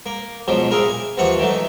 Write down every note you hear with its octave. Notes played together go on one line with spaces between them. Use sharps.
A#3
G#2 B2 F3 F#3
A#2 E4 G#4 A#4 A#5
G#5
D#2 E3 F3 F#5 C#6
D#3 E3 F#3 A3